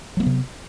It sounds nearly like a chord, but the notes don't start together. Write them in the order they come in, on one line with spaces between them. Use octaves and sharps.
F#3 A3 B3 C3